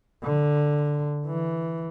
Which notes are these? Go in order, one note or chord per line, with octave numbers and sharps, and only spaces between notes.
D3
E3